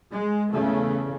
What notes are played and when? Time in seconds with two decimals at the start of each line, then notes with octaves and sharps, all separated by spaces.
0.11 G#3
0.51 E2 C#3 A3